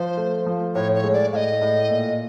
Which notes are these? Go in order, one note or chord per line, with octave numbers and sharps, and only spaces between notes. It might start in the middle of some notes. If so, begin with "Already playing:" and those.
Already playing: F3 C5
A3
F3
A2 C#5
C#5
G#3
D5
A2 D#5 F5
A2
A#2